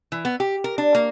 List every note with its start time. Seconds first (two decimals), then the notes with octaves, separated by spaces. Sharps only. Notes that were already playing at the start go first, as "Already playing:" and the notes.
0.12 E3
0.25 B3
0.40 G4
0.64 A#4
0.78 D4
0.95 A#3